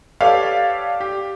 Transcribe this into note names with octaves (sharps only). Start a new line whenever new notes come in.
G4 A4 B4 C#5 D5 F5
G4